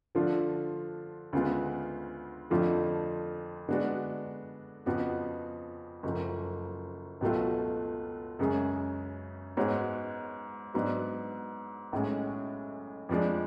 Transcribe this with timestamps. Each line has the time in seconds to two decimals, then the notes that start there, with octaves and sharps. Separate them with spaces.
0.15 D3 F3 A3 D4 F4
1.33 D2 C#3 G#3 B3 F4
2.50 F2 D3 F3 A3 F4
3.69 D3 G#3 B3 D4 F#4
4.86 F2 C#3 F3 B3 F#4
6.03 F#1 F#2 F3 A3
7.21 C#2 B2 F#3 A3 F4
8.39 F#2 C#3 G#3 C#4 G#4
9.57 G#2 G#3 B3 F#4 C#5
10.74 G#2 F#3 B3 D4
11.92 B1 A2 G#3 C#4
13.09 F2 F3 G#3 D4